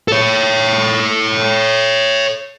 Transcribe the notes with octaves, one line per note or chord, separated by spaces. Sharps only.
A4 C#5